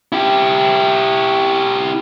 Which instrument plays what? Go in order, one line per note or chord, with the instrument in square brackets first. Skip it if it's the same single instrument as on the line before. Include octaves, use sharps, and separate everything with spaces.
[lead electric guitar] E4 G4